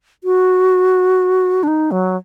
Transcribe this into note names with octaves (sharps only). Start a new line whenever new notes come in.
F#4
D4
D#4
F#3